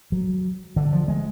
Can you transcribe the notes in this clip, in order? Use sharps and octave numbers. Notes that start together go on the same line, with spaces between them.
F#3
D3
F3
G#3